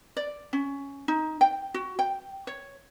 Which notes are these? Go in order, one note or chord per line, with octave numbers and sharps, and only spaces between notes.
D5
C#4
D#4
G5
F#4
G5
C#5